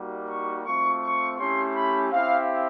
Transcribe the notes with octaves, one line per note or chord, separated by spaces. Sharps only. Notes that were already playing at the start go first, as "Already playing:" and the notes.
Already playing: G3 A#3 D#4 F#4
C#6
A3 C4 F4 C#6
C#6
A3 C#4 E4 G4 C6
B5
C4 E4 G4 F5